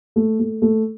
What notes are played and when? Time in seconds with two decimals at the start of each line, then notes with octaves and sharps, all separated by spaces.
0.16 A3
0.39 A3
0.62 A3